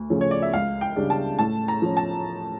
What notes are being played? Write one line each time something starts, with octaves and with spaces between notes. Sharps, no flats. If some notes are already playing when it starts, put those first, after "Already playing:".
Already playing: D2
C#3 F3 A3 C#4
C#5
D5
E5
C#2 F5
G5
C#3 G3 D4
A5
A2 A5
A#5
F3 C#4
A5